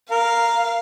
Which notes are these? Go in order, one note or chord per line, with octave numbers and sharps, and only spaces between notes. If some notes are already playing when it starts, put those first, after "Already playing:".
A#4 F5